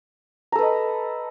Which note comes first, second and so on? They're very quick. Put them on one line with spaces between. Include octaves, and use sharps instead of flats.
A#5 A4 B4 D#5